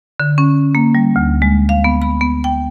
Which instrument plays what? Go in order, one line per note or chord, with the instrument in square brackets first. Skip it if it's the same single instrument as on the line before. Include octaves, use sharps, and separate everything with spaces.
[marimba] D3
C#4
A#3
G3
D2
G#3
F5
B3
B5
B3
G5